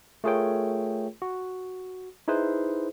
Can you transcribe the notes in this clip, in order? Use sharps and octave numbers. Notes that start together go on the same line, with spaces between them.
A3 F4 G#4 A#4 C#5 G5
F#4
D#4 E4 G#4 B4 C5